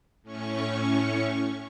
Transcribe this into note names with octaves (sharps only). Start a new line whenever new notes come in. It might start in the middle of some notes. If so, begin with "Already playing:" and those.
A2 C#4 C#6